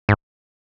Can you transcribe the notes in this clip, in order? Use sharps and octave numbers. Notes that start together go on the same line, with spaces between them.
G#2